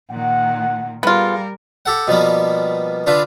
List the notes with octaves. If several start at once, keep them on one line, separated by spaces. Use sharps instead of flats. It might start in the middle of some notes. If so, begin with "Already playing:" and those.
A#2 D#3 F#5
G3 B3 F4 G#4 A#4 F5
G4 A4 F#5
B2 F3 G3 A#3 B3
D3 D4 F4 B4